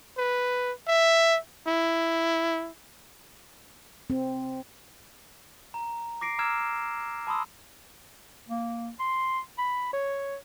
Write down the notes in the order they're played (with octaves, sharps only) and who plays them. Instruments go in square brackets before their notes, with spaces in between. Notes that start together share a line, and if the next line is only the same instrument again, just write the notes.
[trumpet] B4
E5
E4
[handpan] C4
[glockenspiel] A#5
D6 A#6 C7 D7
A#5 D6 E6 F6 G#6 E7
A5 B5 C6 D#6 E6
[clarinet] A#3
C6
B5
C#5